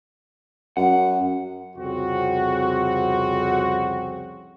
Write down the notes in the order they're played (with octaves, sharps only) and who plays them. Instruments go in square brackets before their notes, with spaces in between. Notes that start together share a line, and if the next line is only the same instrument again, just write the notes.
[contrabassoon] F#2 [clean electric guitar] F#5
[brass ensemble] C2 F2 C#3 C4 F#4